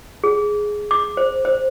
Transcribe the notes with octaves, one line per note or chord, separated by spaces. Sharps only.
G#4
D6
C5
C5